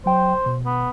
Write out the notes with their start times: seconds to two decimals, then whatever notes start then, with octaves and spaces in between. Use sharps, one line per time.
0.06 F#3 C5 G5
0.46 B2
0.66 B3